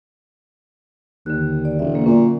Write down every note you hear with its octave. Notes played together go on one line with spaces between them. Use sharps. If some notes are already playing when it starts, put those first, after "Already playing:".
D#2 D3 F#6
D5
E1 E5
D3 A#3
A#2 F#3 C#4